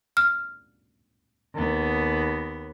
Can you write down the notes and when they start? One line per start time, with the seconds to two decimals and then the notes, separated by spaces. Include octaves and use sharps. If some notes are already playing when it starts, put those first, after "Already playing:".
0.17 F6
1.54 D#2 B3